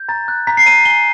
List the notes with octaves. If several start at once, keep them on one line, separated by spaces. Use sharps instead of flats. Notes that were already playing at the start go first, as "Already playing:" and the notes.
Already playing: G6
A#5 A6
F#6
A#5 B6
C7
A#5 D#7
G#5 G7